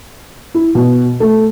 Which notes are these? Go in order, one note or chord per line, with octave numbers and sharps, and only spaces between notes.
E4
B2
A3